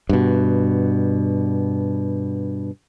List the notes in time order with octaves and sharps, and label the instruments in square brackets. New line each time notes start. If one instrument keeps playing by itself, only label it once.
[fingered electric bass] G2 B2